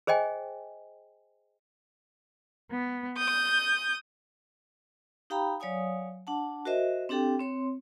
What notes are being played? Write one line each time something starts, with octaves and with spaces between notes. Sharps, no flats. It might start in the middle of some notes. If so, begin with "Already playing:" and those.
G#4 C5 D#5 G5 G#5
B3
D#6 G6
D#4 G4 F5 G5 A#5 B5
F#3 C#5 D5 F5 G#5 D#6
D4 F#5 A5
F#4 A#4 C5 D#5 E5
C4 D4 G4 A4 G5
C4 C#5 C6